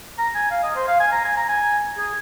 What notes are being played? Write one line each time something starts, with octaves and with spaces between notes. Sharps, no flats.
A#5
G#5
F5
D#5
C5
F5
G#5
A#5
G#5
A#5
G#5
G#4